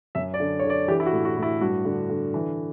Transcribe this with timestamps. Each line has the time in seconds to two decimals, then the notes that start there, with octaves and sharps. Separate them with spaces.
0.15 F#2 E5
0.34 D5
0.40 D3
0.60 D3 C#5
0.70 D5
0.88 E3 G4
1.00 E4
1.06 F#4
1.13 A2
1.25 F#4
1.37 A2
1.43 E4
1.61 G2 F#4
1.85 D3
2.10 D3
2.34 E3